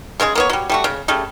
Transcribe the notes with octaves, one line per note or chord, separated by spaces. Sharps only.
C#3 G#3 F4 G#4
A#3 B3 C#5
F#3 G3
G3 A3 F#4
C#3
C#3 G3 A3